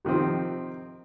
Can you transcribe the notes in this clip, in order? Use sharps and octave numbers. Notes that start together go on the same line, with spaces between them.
C3 D#3 F3 C4